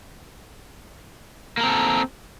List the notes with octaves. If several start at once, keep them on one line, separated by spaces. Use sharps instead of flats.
A#3 C4 A4 A#4